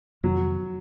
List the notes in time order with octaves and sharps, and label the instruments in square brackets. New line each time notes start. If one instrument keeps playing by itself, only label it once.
[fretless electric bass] F2 C3 D#3 [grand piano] F#3